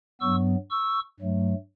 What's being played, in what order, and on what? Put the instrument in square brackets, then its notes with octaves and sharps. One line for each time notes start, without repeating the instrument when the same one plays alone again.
[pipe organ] G2 F#3 B3 C#6 E6
C#6 E6
G2 F#3 A3